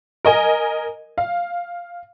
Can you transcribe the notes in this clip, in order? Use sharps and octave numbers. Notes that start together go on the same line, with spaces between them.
A#4 D#5 G#5
F5